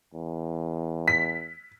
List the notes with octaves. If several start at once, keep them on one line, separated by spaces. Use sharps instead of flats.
E2
B6